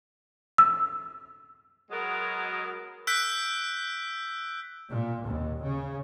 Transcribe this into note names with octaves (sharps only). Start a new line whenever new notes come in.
E6
F#3 G#3 B3 F#4 A#4
E6 F#6 G6 B6 D7
A#2
D#2
C#3